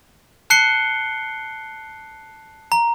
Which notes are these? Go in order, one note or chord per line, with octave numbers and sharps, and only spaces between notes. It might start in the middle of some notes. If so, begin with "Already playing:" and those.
A5 F#6 C7 C#7 G7
A#5